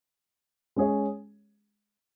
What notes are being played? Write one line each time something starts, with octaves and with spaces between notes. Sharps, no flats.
G#3 C#4 G#4 C#5